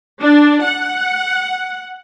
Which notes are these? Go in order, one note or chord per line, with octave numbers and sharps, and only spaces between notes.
D4
F#5